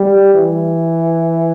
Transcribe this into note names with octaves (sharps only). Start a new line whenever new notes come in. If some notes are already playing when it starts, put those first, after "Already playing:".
Already playing: G3
E3